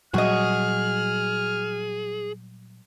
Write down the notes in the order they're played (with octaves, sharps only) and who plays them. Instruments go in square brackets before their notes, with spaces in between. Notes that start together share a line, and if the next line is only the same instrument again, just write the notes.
[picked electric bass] A#2 F#3 G3 [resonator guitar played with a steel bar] F#4 D#5 [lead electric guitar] G#4 [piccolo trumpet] F6